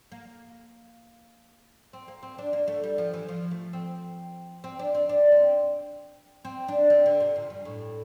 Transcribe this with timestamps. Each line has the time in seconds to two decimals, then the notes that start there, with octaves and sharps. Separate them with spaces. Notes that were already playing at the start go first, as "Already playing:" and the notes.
0.12 A#3
1.93 C4
2.08 A#3
2.23 C4
2.38 D4
2.53 A#3
2.68 A3
2.84 G3
2.98 F3
3.13 E3
3.29 F3
3.51 A3
3.73 C4
4.64 C4
4.79 D4
4.95 C4
5.09 D4
5.32 C4
6.45 C4
6.68 D4
6.90 C4
7.06 D3
7.20 C3
7.36 A#2
7.50 G2
7.65 A2